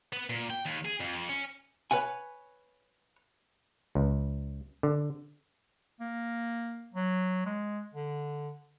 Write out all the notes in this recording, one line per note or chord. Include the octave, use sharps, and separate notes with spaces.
B3
A#2
G5
D#2
G#4
F2
C#4
B4 C#5 F#5 G#5
C#2
D3
A#3
F#3
G#3
D3